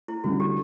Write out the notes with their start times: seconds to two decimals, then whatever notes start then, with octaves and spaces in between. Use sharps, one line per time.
0.08 E4
0.24 D3 G3 C#4 F#4
0.40 G4